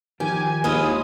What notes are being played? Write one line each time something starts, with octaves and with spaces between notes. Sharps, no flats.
D#3 F3 G4 G#5
D#2 G#3 E4 F4 D#6